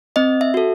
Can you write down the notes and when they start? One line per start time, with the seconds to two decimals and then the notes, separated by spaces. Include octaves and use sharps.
0.16 C4 D#5
0.41 E5
0.54 F#4 A4